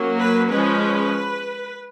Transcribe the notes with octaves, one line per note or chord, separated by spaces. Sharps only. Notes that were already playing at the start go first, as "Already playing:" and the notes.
Already playing: F#3 A#3 C#4
B4
F3 G#3 C#4 B4